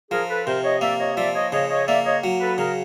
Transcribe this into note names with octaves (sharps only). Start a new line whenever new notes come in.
F3 G#4 A#4
A4 B4
C3 A#4 C5
C#5 D#5
A#3 D5 E5
C#5 D#5
F3 D5 E5
C#5 D#5
C#3 C#5 D#5
C#5 D#5
A#3 D5 E5
C#5 D#5
F#3
A4 B4
C#3 G#4 A#4